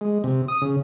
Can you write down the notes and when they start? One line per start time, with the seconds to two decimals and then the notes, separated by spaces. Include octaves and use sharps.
0.01 G#3
0.24 C3
0.48 D#6
0.62 C#3